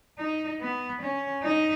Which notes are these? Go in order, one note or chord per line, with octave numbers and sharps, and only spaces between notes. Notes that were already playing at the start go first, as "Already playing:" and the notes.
D#4
B3
C#4
D#4